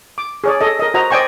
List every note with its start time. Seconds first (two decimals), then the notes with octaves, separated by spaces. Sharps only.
0.18 D6
0.44 G#4 C#5 D5
0.61 A4 D#5
0.79 A#4 D#5
0.94 F#4 C5 D#5 A#5
1.10 C5 D5 D#5 G5 G#5 C#6